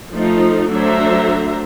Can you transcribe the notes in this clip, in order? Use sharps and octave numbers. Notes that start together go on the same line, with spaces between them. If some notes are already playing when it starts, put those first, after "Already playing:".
F3 A3 D#4
F#3 A3 D4 C5 E5 A#5